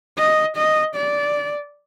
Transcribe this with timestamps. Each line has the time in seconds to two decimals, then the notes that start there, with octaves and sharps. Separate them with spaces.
0.18 D#5
0.57 D#5
0.96 D5